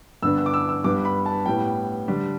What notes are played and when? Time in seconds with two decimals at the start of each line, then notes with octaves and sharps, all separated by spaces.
0.22 G2 D3 B3 D4 E6
0.38 E6
0.46 D6
0.54 E6
0.69 E6
0.84 G2 G3 B3 D4 D6
1.05 B5
1.26 A5
1.46 A2 G3 B3 G5
2.08 D3 G3 D4